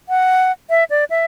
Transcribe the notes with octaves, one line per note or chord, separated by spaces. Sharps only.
F#5
E5
D5
E5